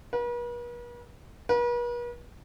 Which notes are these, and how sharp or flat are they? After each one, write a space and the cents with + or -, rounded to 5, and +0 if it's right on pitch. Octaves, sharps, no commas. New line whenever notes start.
B4 -45
B4 -45